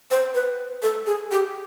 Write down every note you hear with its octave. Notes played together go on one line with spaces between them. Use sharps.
C5
B4
A4
G#4
G4